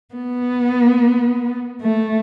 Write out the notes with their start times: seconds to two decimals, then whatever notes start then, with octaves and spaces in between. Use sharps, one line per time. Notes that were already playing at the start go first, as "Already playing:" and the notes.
0.15 B3
1.81 A3